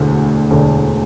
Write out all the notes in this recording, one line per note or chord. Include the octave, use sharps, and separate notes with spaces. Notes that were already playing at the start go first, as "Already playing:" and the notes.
Already playing: E1 D2 D3 A3
E1 D2 D3 A3